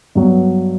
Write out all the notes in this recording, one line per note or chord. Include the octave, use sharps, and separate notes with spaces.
G2 F#3 B3